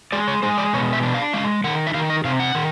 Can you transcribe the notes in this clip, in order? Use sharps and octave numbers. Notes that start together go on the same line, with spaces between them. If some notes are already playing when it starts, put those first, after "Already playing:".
G#3 D5
C#5
G#3 C5
D5
B2 C#5
E5
D4
F5
G#3 F5
D#3 F#5
E5
D#3 F5
D#5
C3 F5
F#5
D#3